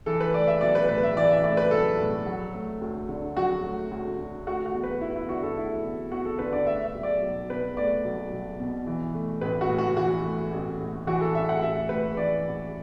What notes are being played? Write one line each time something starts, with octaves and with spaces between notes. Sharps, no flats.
E3 A4
B4
A3 D5
E5
B1 D5
B4
A2 B4
E5
E3 D5
E5
A3 D5
B4
B1 A4
A2
F#3
A3
D2
D3
F#3 F#4
A3
D2
D3
A3 F#4
F#4
E2
B4
E2 E4
E4
D3 F#4
A4
A3 E4
E2
E2 F#4
A4
D3 B4
D5
A3 E5
E5
B1
D5
B1
B2 B4
A3 D5
B1
B1
B2
E3
A3
A1 B4
F#4
A2
F#4
E3 F#4
A3
A1
A2
E3 F#4
A4
A1 E5
F#5
A1 E5
A2 B4
E3 D5
A1